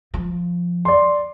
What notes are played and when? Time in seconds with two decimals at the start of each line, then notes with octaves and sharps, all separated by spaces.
0.14 F3
0.85 D5 C6